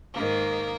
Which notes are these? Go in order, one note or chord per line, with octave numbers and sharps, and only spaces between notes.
G#2 D#3 A#3